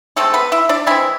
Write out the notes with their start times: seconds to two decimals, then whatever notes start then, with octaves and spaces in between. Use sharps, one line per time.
0.16 E3 G#3 A3 C4 A4
0.34 B3 B4
0.52 E4 E5
0.69 D4 D5
0.86 E3 G#3 C4 E4 E5